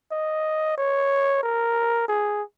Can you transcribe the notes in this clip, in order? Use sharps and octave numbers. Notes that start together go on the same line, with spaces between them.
D#5
C#5
A#4
G#4